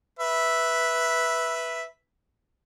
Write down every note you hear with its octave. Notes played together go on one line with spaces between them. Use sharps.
B4 E5